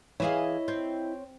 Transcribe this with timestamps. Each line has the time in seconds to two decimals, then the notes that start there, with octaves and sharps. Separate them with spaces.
0.20 E3 E4 G#4 C#5 D#5 F5
0.68 C4